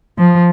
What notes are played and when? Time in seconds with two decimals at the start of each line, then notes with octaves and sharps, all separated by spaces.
0.19 F3